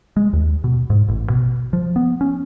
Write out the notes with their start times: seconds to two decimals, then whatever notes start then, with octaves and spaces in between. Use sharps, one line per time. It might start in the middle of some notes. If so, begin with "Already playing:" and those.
0.17 G#3
0.33 D#2
0.64 B2
0.90 G#2
1.08 A1
1.30 B2
1.73 F3
1.96 B3
2.21 C#4